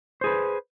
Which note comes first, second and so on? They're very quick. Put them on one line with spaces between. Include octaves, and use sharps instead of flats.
C5 G#4 B4